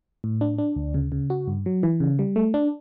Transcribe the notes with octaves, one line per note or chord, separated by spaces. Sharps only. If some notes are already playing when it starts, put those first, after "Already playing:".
A2
D4
D4
D2
C#3
C#3
F#4
G2
F#3
E3
C#3
G3
A3
D4